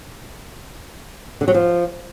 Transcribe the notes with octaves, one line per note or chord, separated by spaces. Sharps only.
D3
F#3
F3